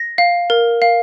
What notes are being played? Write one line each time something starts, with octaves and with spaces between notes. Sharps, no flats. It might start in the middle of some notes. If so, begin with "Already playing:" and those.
Already playing: A#6
F5
A#4
F5